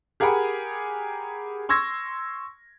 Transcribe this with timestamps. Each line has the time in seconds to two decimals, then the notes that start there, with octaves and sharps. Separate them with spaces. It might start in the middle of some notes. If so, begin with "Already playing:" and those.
0.20 G4 G#4 A#4 F#5 G#5 B5
1.69 C6 C#6 E6 G#6 A#6